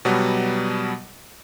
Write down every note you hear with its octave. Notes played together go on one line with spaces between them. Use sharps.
B2 F#3 G3 B3